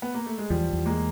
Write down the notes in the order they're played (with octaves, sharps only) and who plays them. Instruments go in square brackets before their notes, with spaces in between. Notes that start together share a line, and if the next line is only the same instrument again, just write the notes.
[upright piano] B3
A#3
A3
G#3
[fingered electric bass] E2 [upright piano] F3 G3
[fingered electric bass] E2
[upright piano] G#3 A#3